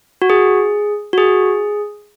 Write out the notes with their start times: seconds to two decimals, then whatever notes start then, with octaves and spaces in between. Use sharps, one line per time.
0.22 F#4
0.30 G#4
1.13 F#4
1.18 G#4